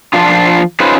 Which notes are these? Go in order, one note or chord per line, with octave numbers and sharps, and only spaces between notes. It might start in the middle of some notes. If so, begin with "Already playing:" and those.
F3 D4 F4
C#4 D#4 F4 G#4 B4 C5